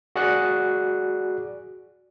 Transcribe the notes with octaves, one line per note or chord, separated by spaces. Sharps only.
F#4 G#4 D5 F#6